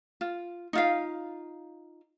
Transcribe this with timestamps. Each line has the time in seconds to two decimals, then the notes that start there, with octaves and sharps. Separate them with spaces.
0.21 F4
0.73 D#4 F4 F5